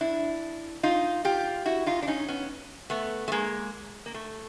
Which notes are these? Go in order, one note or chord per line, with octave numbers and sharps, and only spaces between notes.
D4 E4
D#4 F4
F4 G4
E4 F#4
D#4 F4
D4
C#4 D#4
B3 C#4
A3 B3
A3
G#3 A#3
A#3
A3